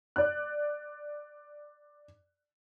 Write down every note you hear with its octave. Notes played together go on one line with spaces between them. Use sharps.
D5 F#6